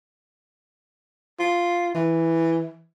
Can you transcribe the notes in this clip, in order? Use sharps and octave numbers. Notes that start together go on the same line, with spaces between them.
F4
E3